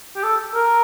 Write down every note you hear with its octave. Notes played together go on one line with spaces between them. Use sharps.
G4
A4
A#4